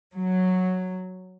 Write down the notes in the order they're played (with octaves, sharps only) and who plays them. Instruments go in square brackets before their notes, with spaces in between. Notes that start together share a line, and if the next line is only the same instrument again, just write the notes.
[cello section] F#3